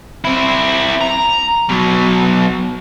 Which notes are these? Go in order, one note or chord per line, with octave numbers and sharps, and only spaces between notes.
C4 E4
A#5
B2 F#3